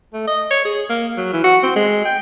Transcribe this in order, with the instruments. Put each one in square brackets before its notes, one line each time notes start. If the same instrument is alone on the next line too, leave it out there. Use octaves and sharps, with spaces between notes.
[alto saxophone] A3
D#5
C#5
G#4
A#3
F#3
E3
F#4
C4
G#3
G5